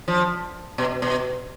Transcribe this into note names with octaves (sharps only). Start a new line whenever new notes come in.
F3
B2
B2